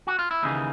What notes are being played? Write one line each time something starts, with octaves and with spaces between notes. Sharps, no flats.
F#4
F4
E4
D#2 C#3 E3 D#4